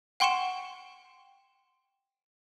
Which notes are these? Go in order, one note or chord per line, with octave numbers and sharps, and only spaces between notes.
F#5 G5 C6 C#6 C#7 E7